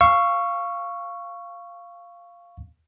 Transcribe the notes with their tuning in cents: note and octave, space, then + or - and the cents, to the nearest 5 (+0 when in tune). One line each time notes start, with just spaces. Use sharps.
F5 -5 C#6 +0 E6 +40